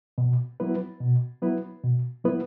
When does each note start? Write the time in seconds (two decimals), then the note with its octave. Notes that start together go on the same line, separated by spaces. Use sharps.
0.18 B2
0.60 F#3 B3 E4 B4
1.00 B2
1.42 F#3 B3 E4 B4
1.84 B2
2.24 F#3 B3 E4 B4